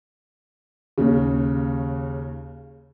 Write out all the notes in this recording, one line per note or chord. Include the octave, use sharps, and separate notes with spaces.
D#2 C#3